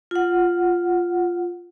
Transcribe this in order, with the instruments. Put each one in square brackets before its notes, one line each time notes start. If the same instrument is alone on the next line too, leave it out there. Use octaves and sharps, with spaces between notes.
[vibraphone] F4 F#5